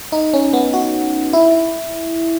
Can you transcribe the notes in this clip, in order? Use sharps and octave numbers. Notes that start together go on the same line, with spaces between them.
D#4
C#4
B3
F#4
E4